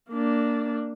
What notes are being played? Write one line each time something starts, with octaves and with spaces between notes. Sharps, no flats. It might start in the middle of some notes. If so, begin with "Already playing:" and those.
A#3 D4